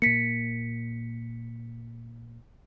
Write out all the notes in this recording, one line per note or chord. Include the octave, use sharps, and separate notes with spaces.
A#2 A#3 B6 C#7